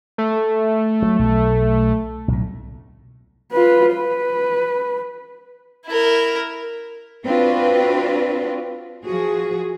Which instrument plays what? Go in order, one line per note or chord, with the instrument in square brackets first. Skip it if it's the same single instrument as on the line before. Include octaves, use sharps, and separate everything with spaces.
[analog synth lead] A3
[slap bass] F#3
B1
B1 A2
[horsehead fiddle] F4 B4
B4
[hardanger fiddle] E4 A#4
[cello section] C4 D4 F4 F#4 B4
F3 F#4 G#4